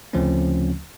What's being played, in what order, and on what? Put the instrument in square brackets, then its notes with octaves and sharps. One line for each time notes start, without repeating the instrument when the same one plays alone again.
[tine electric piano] D2 C#3 F3 A3 C4 C#4